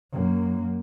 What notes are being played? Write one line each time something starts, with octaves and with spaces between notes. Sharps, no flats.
F#2 A#3